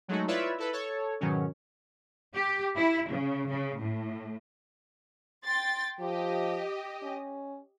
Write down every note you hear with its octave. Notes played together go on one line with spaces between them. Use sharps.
F#3 G#3 A3 D#4 F#4
E4 F4 B4 C#5 D5 E5
E4 A4 B4
A4 C#5
G#2 B2 D#3 F#3 C#4
G4
E4
C#3
C#3
A2
G5 C6 A6
F3 G4 D#5
C#4